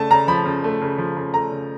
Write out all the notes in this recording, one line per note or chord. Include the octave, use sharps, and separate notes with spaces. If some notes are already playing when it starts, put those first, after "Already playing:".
Already playing: C#3 A3 A5
C#3 A#5
F3 B5
C#3
A3
C#3
F3
C#3
A3 A#5
C#3